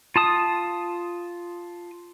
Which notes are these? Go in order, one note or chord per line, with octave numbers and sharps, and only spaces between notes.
F4 A5 D#6